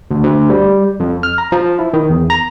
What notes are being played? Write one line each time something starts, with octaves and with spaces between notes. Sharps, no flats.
D2
D2
G3
F2
F6
A#5
F3
E4
D#3
E2
A#5